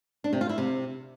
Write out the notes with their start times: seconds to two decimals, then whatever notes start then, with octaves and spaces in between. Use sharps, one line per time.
0.24 D4
0.33 C3
0.41 F4
0.49 E4
0.58 C3